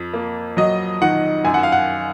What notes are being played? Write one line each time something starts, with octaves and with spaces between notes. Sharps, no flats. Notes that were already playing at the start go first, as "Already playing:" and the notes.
Already playing: F2
A#3
F#3 D#5
D#3 F#5
F#2 G#5
F#5
F5
F#5